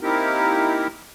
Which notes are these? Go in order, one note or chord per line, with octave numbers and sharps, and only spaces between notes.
A#3 C4 D#4 E4 G4 A#4